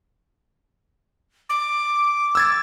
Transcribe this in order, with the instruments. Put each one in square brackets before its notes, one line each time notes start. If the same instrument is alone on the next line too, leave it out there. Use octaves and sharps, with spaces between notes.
[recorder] D6
[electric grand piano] E6 G#6 A6